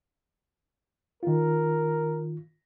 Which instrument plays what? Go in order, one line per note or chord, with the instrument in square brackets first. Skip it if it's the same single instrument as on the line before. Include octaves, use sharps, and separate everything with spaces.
[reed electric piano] D#3 F4 [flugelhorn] A#4